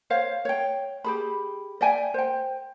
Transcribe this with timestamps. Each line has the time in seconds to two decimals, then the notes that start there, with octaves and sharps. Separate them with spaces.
0.10 C5 C#5 F5
0.45 C#5 G5
1.04 G4 G#4 B5
1.81 D5 E5 G5 G#5
2.14 C5 G5